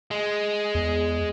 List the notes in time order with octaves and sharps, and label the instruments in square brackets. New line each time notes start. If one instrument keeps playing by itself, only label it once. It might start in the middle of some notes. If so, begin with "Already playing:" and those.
[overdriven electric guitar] G#3
[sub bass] E2